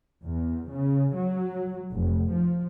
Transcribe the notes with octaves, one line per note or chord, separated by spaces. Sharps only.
E2
C#3
F#3
F1
F3